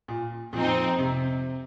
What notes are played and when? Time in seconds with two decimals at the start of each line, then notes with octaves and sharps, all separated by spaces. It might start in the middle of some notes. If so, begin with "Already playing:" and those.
0.08 A#2
0.53 F2 A#2 F3 C4 D#4
0.99 C3